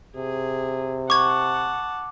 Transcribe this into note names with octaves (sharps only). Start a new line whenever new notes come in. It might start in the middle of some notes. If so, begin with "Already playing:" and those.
C3 G#4
F#5 A5 C#6 D6 G#6